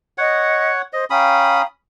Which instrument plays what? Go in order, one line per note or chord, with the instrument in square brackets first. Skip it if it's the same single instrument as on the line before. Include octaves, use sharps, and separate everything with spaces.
[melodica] C#5 F#5 [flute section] D#5
[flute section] C5 [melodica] D#5
[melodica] C#4 B5 D#6 [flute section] F5 G5 A#5